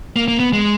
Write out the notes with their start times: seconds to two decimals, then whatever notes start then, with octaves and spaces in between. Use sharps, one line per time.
0.16 A#3
0.28 A#3
0.40 B3
0.53 G#3